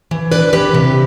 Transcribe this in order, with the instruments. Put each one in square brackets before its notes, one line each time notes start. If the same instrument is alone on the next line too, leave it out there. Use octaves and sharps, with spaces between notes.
[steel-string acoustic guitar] E3
D4 B4 D5
E3 G4 B4
C3